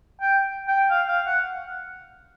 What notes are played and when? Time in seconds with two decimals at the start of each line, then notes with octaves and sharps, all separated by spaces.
0.21 G5
0.68 G5
0.90 F5
1.08 F5
1.26 F#5